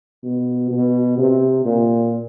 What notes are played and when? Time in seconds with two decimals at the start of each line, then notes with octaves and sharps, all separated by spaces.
0.24 B2
0.71 B2
1.18 C3
1.65 A#2